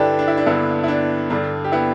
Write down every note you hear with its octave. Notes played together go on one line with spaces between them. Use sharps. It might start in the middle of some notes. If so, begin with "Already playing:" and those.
Already playing: G2 D3 D4 E4 G4 A4 B4
D4
E4
D4
G2 D3 B3 E4
E4
D4
G2 D3 D4
G4
B3 E4